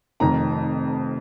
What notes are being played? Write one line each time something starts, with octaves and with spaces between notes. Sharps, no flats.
F1 F2 D#3 A#5